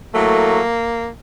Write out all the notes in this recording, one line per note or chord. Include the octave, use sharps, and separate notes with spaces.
A2 F#3 A3 A#3